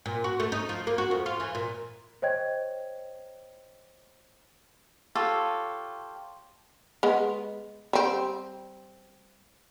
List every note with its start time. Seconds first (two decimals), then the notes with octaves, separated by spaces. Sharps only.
0.06 A#2
0.24 F#4
0.40 A3
0.52 D#4
0.69 F3
0.87 A#3
0.98 F#4
1.11 F2
1.26 F4
1.40 E3
1.55 A#2
2.22 C5 C#5 D#5 G5 G#6
5.15 F4 G4 A4 C#5
7.03 G#3 B3
7.93 G3 C4